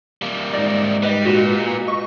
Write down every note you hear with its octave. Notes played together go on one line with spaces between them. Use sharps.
G3 A#3
G#2 D#4 D5
G3 B4 D#5
A#2 F#4 G4 B4
D#5 C#6